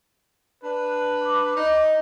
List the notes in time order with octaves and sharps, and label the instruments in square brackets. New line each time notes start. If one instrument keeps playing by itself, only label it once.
[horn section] D4 B4
[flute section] B5 D6
[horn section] D#4